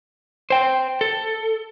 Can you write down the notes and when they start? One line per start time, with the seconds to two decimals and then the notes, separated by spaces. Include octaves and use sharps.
0.50 C5 G5
1.01 A4